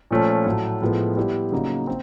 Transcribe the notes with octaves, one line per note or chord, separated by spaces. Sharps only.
A#2 F3 A3 C#4
A2 F#3 A3
A2 F3 G#3 B3
G3 B3 E4 G4
C#3 F#3 A#3 D#4
C4